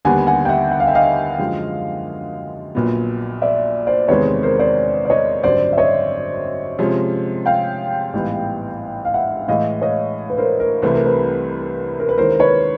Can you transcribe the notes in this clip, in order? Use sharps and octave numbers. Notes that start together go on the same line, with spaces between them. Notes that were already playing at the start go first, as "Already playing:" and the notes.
D#2 D3 G3 B3 D4 F#5 G#5
F#5 G#5
G5
E5 F#5
F#5
F5
E5
D#5 F5
F#2 D3 F3 G#3
A#1 A#2 F#3 B3
D5 E5
C5 D5
E2 C3 D#3 G#3 C4 B4 C#5
B4
A#4 C5
C5 D5
D5
C#5 D#5
G#1 F#2 D3 G3 C5 D5
E5
C#5 D#5
C3 F3 G#3 C#4
F5 G5
A1 G#2 E3 G3 B3
F5
E5 F#5
A2 E3 G#3 D#5 F5
C#5 D#5
B4
A#4 C5
A#4
C2 C3 E3 A3 C4 B4
A#4
B4
A#4
B4
D#2 D#3 G#3 C#4 E4 A#4 C5
B4 C#5